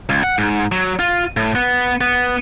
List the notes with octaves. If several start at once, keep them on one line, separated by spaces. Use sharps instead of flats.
C#2
F#5
G#2
F#3
F4
A2
B3
B3